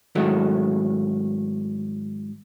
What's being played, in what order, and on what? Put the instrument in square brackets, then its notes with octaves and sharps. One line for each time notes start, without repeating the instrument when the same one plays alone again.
[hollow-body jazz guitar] G#2 D#3 F#3 A3 E4